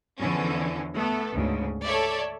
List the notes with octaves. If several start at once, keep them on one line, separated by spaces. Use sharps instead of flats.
E2 D3 E3 F3 C#4
A3 B3 A4
D2 G#2 C#3
A4 C#5 D5 E5